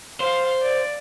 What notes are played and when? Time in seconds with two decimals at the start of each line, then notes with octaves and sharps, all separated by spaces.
0.20 C5 F5
0.62 D5